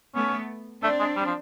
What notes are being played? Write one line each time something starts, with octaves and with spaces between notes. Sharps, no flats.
A3 B3 C#4
A3 C4 D4
G#3
G3
F3